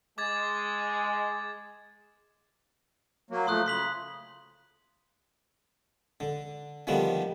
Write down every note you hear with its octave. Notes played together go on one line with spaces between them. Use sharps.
G#3 D6 G#6 A6
F#3 A#3
F3 A3 C6 D#6 F#6
C#3 C6 B6 F#7
D3
D3 D#3 F3 G3 B3